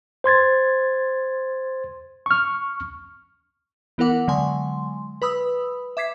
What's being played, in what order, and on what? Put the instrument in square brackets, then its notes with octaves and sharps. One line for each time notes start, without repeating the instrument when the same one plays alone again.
[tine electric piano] C5 C6 G#6 A6
[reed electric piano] C#6 F6
[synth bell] E3 B3 E4 A#4 F#5 D6
D3 F#3 G#3 G#5 C6
B4 B5 D#6 E6
E5 D6 G#6 B6 C7